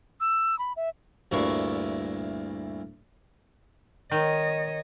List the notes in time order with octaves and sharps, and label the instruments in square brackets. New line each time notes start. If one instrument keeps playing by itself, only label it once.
[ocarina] E6
B5
E5
[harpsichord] D2 G2 A#2 E4 C#6
[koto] D#3 [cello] C#5 D#5